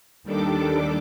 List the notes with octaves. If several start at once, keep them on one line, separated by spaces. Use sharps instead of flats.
D#2 D#3 G3 D4 A4 D6